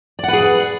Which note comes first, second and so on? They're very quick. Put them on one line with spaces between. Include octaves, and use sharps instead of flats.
D5 F#5 B4 G#4